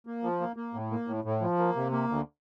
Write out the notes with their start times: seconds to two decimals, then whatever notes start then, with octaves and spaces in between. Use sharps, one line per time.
0.07 A#3
0.23 F3
0.40 A#3
0.56 A#3
0.74 A2
0.91 A#3
1.07 A2
1.24 A2
1.41 F3
1.58 A#3
1.76 C3
1.92 A#3
2.09 D2